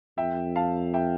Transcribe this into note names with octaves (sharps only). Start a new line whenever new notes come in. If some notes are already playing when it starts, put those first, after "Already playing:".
F2 E5 G5
F5 A5
E5 G5